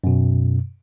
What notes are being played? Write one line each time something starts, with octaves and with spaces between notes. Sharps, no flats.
F#2 B2